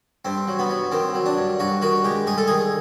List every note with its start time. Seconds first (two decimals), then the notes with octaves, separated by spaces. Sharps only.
0.25 G2 C4
0.47 F#3
0.59 B3
0.69 F#3
0.92 D#3 C4
1.14 F#3
1.26 D4
1.38 G2
1.60 G2 F#4
1.82 D#3 F#4
2.05 G#3 G4
2.27 G2 G#4
2.38 A4
2.47 D#3 G#4